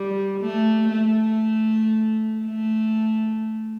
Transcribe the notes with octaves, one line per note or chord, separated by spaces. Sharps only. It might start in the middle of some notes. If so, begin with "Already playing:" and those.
Already playing: G3
A3
A3
A3